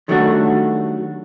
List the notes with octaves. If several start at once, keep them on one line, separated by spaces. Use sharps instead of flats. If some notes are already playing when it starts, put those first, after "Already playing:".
D#3 F#3 G3 A3 D4 F#4